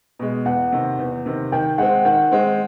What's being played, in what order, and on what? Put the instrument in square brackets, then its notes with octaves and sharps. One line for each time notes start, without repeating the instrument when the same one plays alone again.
[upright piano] B2 G#3
[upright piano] E2 [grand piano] F#5
[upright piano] C3 D#3
E2
C3 D#3
[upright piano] D#3 [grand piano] G5
[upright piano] G#3 C4 [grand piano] F#5
[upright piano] D#3 [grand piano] F#5
[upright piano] G#3 C4